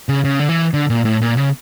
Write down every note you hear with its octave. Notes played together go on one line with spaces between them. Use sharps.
C#3
C#3
D3
E3
D3
A#2
A2
A#2
C#3